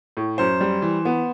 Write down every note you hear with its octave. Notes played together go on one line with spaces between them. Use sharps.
A2
F#2 C5
G3
E3
B3